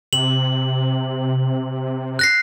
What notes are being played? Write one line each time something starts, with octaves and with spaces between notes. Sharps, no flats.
C3 F#7
F#6 A#6 C7